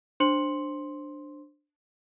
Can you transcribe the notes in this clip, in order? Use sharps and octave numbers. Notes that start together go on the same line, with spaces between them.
D4 C5 C6 C#7 F#7